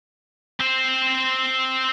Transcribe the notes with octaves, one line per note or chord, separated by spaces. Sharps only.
C4 C5